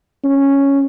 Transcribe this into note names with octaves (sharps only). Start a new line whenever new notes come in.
C#4